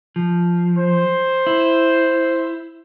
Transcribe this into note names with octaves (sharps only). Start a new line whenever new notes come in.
F3
C5
E4